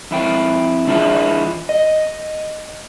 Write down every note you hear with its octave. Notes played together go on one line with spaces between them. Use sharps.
F2 E4 G5
E3 D4 E4 F4 G#4 E5
D#5